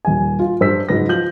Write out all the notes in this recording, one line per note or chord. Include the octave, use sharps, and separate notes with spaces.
D#1 G#5
F4
G2 C5 E6 B6
C#2 G#2 F#3 B4 A#6
F3 G6 F#7